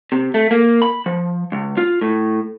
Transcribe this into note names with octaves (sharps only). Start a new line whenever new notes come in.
C3
A3
A#3
B5
F3
C#2
F4
A2